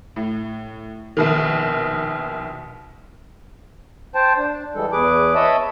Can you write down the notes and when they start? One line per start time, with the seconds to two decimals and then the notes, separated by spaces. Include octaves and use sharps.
0.16 A2
1.17 A#1 B2 D#3
4.15 C5 G5 A5
4.37 D4
4.75 E3 G3 G#3 A4
4.92 E2 G#4 B4 D6
5.35 C#5 D#5 E5 A5 B5 D#6